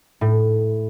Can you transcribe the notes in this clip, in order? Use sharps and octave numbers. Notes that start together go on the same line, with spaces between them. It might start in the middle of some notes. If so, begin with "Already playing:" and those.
A2